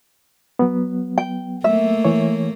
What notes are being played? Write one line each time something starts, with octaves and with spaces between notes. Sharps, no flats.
F#3 B3
G5
A3 A#3 E5
E3 C#5